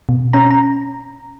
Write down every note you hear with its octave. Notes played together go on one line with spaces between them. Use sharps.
B2
C#4 A#5
A#5